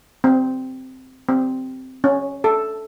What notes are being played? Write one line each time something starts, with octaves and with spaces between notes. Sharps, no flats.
C4
C4
C#4
A4